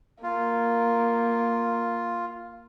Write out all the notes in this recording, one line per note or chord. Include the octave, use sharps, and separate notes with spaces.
A#3 F4